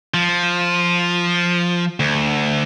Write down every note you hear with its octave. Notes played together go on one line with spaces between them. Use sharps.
F3
D2